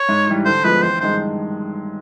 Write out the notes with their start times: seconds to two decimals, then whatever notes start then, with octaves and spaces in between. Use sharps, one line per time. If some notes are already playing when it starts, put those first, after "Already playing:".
Already playing: C#5
0.09 G#2
0.27 E3 G3
0.45 D3 C5
0.64 F3 G#3 B3 B4
0.82 A1 C5
1.01 G2 D#3 G#3 C5